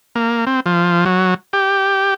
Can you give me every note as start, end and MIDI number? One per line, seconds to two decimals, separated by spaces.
0.16 0.45 58
0.47 0.60 60
0.66 1.05 53
1.05 1.34 54
1.53 2.14 67